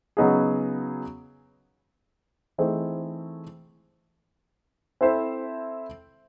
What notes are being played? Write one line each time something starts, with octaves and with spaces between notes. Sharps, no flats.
C#3 F#3 B3 D#4 G#4
E3 A3 C4 D#4 G#4
C4 E4 A4 C5 E5